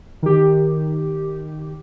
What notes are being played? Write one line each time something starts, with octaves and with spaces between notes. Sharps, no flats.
D#3 G4